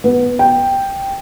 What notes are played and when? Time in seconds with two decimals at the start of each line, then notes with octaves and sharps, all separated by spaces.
0.04 B3
0.39 G5